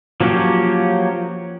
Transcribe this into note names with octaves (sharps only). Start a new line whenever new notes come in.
F3 F#3 A#3 C#4 G4